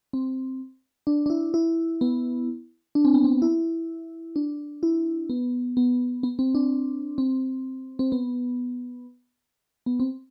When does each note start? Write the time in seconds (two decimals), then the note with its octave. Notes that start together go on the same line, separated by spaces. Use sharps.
0.13 C4
1.07 D4
1.26 D4
1.30 E4
1.54 E4
2.01 B3
2.95 D4
3.05 C4
3.14 B3
3.24 C4
3.42 E4
4.36 D4
4.83 E4
5.30 B3
5.77 B3
6.23 B3
6.39 C4
6.55 D4
7.18 C4
7.99 C4
8.12 B3
9.86 B3
10.00 C4